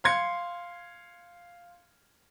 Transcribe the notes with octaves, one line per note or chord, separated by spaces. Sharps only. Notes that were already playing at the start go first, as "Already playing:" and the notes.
F5 C6 G#6 C#7